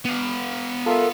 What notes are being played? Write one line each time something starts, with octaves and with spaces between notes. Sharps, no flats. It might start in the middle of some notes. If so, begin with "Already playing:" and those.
B3 F5
F4 A4 A#4 E5